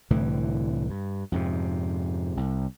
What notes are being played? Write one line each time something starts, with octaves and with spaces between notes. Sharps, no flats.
C2 A2 D3 E3
G2
F2 G#2 C3
C2